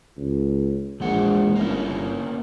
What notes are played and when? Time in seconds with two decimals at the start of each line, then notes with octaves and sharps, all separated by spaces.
0.17 C#2
1.00 A#1 E2 G#3 F#5
1.56 G1 A#3 C#4 E4